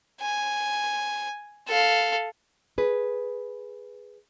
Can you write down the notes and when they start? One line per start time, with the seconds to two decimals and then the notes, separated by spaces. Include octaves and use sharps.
0.21 G#5
1.67 A4 F5
2.78 G#4 B4